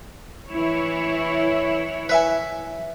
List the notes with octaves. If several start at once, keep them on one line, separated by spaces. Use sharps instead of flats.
E3 E4 C#5
B4 E5 G#5